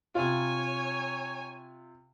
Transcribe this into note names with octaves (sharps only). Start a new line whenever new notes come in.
C3 F4 C#5 G#5